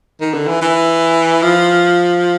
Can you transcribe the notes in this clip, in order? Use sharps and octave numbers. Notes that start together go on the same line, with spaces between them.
D#3
D3
E3
E3
F3